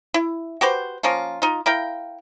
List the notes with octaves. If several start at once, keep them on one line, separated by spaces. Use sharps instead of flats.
E4
F#4 G4 B4 C5
F3 A#3 C#4 F4
D#4 F4
E4 A#4 F5 G5